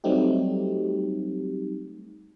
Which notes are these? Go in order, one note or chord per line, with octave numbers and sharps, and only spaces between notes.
F#3 G3 A3 C4 D#4 G4